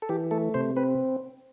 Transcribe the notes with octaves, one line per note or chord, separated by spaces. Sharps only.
A4
E3 G4
A3 A4
C3 C5
C4 B4